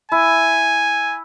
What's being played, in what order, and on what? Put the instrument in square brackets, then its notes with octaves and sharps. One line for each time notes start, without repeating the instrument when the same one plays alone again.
[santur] E4 [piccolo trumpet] G#5